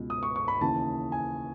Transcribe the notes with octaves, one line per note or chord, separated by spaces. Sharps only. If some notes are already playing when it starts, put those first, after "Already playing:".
Already playing: C#2 B2
D#6
C#6
C#6
B5
D#2 C#3 E3 A5
G#5